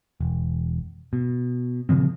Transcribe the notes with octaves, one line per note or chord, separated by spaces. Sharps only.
E1
B2
A#2 C#3 F3 C4